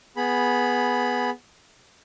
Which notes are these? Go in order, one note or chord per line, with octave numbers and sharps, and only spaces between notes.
B3 G#4 B5